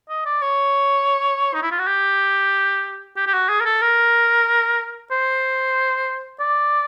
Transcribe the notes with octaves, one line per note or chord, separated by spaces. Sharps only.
D#5
D5
C#5
D#4
E4
F4
F#4
G4
G4
G4
F#4
G#4
A#4
A4
A#4
C5
D5